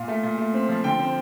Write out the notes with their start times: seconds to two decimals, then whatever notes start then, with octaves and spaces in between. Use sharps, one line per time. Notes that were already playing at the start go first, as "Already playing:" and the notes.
Already playing: A#2 F5
0.08 A3
0.23 A#2
0.38 A3
0.54 C4
0.69 F3
0.84 D3 G5
0.99 C4